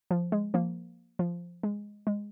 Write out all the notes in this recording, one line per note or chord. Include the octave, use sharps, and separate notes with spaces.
F3
G#3
F3 A#3
F3
G#3
G#3